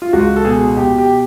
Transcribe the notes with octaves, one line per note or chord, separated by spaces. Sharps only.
F4
C#2 F#4
A4
B2 G#4
B2 G4
G4